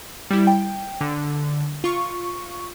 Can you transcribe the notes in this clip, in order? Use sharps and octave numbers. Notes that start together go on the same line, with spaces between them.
G3 E4
G5
D3
F4 C#6